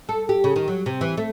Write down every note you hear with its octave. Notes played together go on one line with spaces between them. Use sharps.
A4
G4
C#3
D#3
F#3
C3
E3
A3